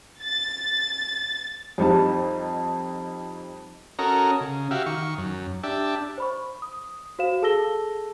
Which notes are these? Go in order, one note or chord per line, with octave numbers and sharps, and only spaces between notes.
A6
F2 G3 D#4 A5
C#4 F#4 A4 A#4 D#5 A#5
C#3
F#4 G4 E5 F5
D#3 C#6
F#2
D4 G4 E5 A5
C5 B5 C#6
D#6
F#4 C5 F5 E7
G#4 A4 A5 E6 A#6 G7